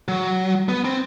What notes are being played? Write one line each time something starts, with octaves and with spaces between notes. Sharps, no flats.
F#3
B3
C4